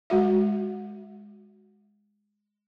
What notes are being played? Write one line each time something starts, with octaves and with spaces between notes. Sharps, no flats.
G#3 F#4 E5